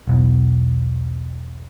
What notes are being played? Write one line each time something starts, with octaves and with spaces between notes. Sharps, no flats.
E1 B1 E2